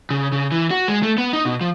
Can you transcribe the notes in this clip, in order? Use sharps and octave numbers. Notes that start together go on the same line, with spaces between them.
C#3
C#3
E3
F#4
G#3
A3
B3
D#4
B2
F3